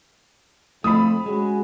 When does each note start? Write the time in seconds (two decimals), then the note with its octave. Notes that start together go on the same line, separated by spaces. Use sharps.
0.84 F2 F3 A3 B5 D#6
1.26 G#3 C#4 F#4 G#4